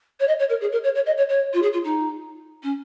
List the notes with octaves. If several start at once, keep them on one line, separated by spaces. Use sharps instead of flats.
C#5
D#5
C#5
A#4
G#4
A#4
C#5
C#5
D#5
C#5
C#5
F4
G#4
F4
D#4
C#4